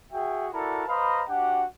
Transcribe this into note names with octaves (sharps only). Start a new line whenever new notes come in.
F#4 G#4 E5 G5
E4 F#4 A4 A#4 D5 A5
B4 C5 D#5 F5 A#5 B5
D4 F#4 G4 F#5